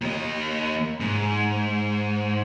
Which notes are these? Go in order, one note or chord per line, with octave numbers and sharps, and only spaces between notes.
D#2 D#5
G#2